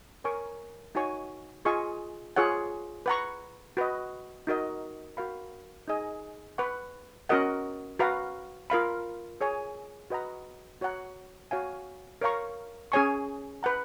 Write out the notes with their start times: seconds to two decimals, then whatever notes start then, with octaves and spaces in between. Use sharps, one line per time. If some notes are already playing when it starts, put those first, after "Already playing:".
0.24 A#4 C#5 G#5 C#6
0.95 D#4 F#4 C#5 G#5 C#6
1.65 F4 G#4 D#5 G#5 C#6
2.36 F4 G#4 C#5 F#5
3.06 B4 F#5 A#5 C#6
3.77 F#4 B4 D#5
4.47 D#4 F#4 A#4 D#5
5.17 F#4 A#4 F5 B5
5.88 D#4 G#4 D#5 G#5
6.58 B4 F#5 C#6
7.29 C#4 F#4 A#4 D#5 F#5
7.99 F#4 B4 F5 A#5
8.70 F4 A#4 F5 B5
9.41 G#4 C#5 G#5
10.10 F#4 B4 D#5 F#5 A#5
10.81 F#4 C#5 F#5 A#5
11.51 F#4 C#5 F5 G#5
12.21 A#4 C#5 F5 A#5 C#6
12.92 C#4 G#4 C#5 G#5 C#6
13.63 B4 F#5 A#5